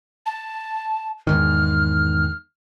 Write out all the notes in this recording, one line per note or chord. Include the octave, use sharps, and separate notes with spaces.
A5
E2 G#2 D#3 F6